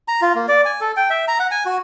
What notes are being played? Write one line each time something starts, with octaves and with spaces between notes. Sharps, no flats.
A#5
F4
A#3
D5
G#5
A4
G5
E5
A#5
F#5
G#5
F#4